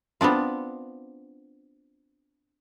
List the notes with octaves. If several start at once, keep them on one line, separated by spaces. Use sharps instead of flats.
B3 C4 D4 F4